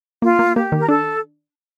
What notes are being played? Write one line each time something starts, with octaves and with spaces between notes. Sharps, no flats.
A#3 F4
A#3
A#3 G4
D#3
A#4
D4 A4